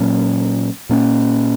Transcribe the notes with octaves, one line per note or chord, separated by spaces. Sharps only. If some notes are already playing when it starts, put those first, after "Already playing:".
Already playing: A#2 F#3 A#3 C#4
A#2 A#3 C#4